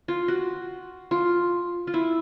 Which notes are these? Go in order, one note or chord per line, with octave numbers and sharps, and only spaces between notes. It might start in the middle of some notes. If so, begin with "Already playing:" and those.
F4
F#4
F4
F4
E4